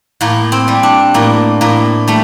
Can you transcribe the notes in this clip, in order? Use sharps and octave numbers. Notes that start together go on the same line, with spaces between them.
A2 A#3
C4
G3
D4
A2 A#3
A2 A#3
G3 A3